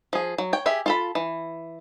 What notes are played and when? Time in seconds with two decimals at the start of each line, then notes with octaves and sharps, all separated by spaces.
0.13 F3 G#4
0.38 F#3
0.53 C#5 G5
0.66 G4 G#4 E5
0.86 F4 A4 B5
1.15 E3